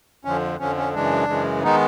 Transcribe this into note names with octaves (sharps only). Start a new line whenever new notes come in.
F2 D3 F3 C#4
F2 D3 F3 C#4
C#4
F#2 C#3 E3 G#3 D4
F#2 C#3 E3 G#3
D#3 G#3 B3 D#4